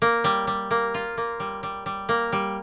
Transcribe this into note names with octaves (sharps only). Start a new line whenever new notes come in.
A#3
G3
G3
A#3
F4
A#3
G3
G3
G3
A#3
G3